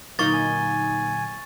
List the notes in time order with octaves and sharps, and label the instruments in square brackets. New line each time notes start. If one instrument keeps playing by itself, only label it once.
[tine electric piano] A#2 D3 F#3 [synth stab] A#3 D#4 [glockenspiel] C#6 A6 [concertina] F6
[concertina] G#5